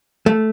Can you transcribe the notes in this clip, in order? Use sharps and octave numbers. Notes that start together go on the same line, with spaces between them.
A3